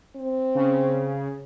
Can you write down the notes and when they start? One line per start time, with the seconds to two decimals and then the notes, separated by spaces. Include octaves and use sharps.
0.16 C4
0.55 C#3